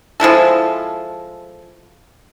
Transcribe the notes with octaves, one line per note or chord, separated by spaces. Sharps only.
F3 G#3 E4 A4